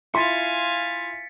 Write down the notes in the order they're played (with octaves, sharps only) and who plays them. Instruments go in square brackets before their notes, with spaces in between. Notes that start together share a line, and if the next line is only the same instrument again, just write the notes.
[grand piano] E4 F4 C6 [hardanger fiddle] F5 G#5 [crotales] A6 B6 C#7